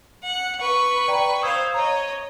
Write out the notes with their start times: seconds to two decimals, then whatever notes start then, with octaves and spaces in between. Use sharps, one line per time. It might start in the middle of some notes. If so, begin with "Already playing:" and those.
0.23 F#5
0.61 B4 C#6
1.08 D5 G5 A#5
1.42 C5 F5 D#6 E6 G#6
1.74 C#5 D#5 A#5